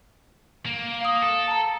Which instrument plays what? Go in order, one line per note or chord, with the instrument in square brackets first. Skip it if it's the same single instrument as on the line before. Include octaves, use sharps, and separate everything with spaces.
[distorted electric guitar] A#3
[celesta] F5 D#6
[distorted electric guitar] A4
[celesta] A5 A#5